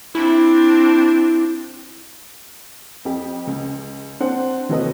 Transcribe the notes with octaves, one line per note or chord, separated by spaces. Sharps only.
C4 D4 E4
F2 G4
C#2
C4 D4 C5 F#5
D#2 C3 F#3 A4 B4 D#5